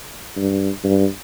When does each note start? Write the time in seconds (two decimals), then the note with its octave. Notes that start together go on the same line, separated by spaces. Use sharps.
0.36 G2
0.84 G2